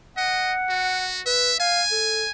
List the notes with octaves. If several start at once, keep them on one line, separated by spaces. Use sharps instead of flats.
D#5 F#5
F#4
B4 E5
F5 G#5
A4